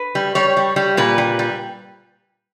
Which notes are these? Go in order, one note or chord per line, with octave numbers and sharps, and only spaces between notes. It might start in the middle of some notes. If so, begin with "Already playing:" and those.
Already playing: B4
G3
G3 C#5
G3
G3
A#2 B4
G3
G3